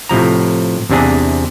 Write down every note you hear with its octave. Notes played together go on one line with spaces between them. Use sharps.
A2 C3 F3 A#5
E2 C3 D4 G#4